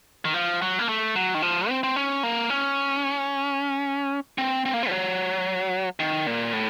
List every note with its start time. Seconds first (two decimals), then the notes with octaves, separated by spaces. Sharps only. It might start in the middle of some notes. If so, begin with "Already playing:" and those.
0.25 D#3
0.34 F3
0.62 F#3
0.79 A#3
0.89 A3
1.16 F#3
1.34 D#3
1.42 F3
1.69 C4
1.83 C4
1.96 C#4
2.23 A#3
2.50 C#4
4.38 C4
4.65 C4
4.74 A#3
4.83 C4
4.88 F3
4.91 F#3
6.00 D#3
6.27 A#2
6.53 A2